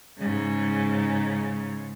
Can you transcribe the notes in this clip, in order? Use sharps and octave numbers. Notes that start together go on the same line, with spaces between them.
G#2 C#3